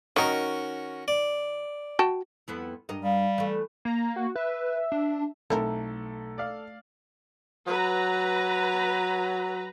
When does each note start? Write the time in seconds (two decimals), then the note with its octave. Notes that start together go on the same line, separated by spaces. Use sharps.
0.16 D#3 C#4 D#4 F#4 A#4
1.08 D5
1.99 F#4 G5 A5
2.48 F2 B3 E4
2.89 G2 A#4 D#5
3.03 G3 F5
3.38 E3 A3
3.85 A#3 A#5
4.16 F#4
4.36 B4 E5
4.92 D4
5.50 B1 A3 C4 E4 A4 A#4
6.38 D5 F5
7.67 F#3 B4 A#5